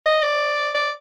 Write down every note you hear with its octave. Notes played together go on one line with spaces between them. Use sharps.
D#5
D5
D5